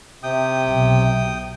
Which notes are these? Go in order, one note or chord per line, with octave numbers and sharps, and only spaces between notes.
C3 G5 D#6
B1